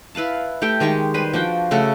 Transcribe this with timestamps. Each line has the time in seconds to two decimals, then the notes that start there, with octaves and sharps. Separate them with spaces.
0.15 E4 B4 F5 A5
0.62 A3 G4 A4 G5
0.80 D#3 G#3 G4 C#6
1.14 G3 B4 C5 G#5
1.33 F3 D4 F#4 G5
1.71 C#3 A3 F#4 A4